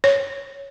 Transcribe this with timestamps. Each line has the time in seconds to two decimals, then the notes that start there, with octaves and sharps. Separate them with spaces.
0.04 C#5